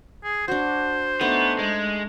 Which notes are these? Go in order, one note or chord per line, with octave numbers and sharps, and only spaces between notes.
G#4
D4 F#4 C5
A3 B3 D4 D#4
G#3